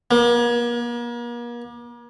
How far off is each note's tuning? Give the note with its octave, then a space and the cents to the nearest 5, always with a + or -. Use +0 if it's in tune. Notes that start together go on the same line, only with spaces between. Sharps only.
A#3 +40